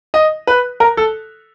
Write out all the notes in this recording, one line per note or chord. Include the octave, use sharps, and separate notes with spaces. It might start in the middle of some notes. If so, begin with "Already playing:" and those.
D#5
B4
A#4
A4